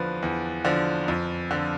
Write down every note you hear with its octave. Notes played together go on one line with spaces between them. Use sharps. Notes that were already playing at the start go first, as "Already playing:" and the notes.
Already playing: E2 D3 F3 B4
E2
D3 F3
F2
D3 F3